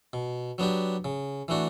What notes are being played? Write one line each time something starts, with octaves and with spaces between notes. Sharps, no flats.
B2
F#3 B3 D4 G4
C#3
E3 A3 D4 F#4